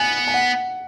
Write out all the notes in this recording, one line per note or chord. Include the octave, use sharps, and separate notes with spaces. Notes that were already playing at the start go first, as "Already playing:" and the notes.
Already playing: B3 G#5
G#5
F#5